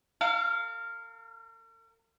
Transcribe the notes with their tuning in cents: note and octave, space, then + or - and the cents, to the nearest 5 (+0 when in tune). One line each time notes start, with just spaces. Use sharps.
A#4 -45 F5 +0